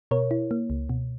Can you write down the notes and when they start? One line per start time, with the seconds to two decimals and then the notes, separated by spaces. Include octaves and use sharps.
0.11 B2 A#4 C#5
0.31 E4
0.51 A#3
0.70 C#2
0.89 B2